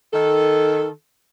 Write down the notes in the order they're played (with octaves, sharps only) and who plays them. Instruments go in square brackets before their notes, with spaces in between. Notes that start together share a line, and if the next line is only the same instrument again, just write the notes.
[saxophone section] D#3 A4